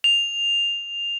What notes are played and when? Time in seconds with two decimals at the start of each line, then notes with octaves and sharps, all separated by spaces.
0.04 F7